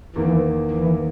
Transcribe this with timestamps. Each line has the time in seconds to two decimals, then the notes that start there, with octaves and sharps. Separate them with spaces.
0.16 E2 D#3 E3 A#3
0.71 E3